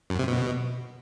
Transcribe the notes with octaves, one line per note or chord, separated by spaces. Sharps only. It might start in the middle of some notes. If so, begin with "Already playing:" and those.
F#2
C3
B2